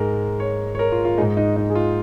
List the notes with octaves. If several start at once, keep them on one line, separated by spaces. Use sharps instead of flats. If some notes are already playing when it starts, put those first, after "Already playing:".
Already playing: G#2 G#3 A#4
C#5
C#5
A#4
F4
F4
G#2 G#3 D#4
D#4
D#4
G#4
F4